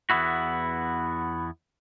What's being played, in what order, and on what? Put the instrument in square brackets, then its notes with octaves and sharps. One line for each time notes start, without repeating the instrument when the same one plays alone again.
[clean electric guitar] E2 G#2 B3 E4 F#4